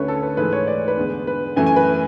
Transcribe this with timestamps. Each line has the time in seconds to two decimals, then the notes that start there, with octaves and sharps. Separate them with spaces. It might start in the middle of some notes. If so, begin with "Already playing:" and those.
Already playing: D2 D3 A3 C#4 B4 C#5
0.08 A4
0.23 B4
0.37 G#2 E3 A3 B4
0.53 C#5
0.67 D5
0.88 B4
0.97 E2 D3 G#3
1.27 B4
1.56 F#2 E3 A3 G#5
1.67 G#5
1.76 B4